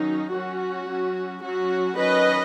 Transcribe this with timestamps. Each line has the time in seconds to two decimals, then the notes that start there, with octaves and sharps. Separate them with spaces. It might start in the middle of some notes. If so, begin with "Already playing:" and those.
Already playing: D#3 F#3 C#4 D#4
0.31 F#3 C#4 F#4
0.86 F#3 C#4
1.42 F#3 C#4 F#4
1.97 D#3 F#3 C#4 B4 D#5